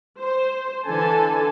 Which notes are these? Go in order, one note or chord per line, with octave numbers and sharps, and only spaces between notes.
C5
D3 E3 A4 G#5 A5